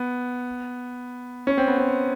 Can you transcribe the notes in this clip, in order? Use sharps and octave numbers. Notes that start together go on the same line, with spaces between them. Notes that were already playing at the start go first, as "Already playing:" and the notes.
Already playing: B3
C#4
C4
B3
C4